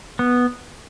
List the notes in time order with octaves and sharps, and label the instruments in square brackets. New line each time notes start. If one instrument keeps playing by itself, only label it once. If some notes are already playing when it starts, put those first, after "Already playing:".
[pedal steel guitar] B3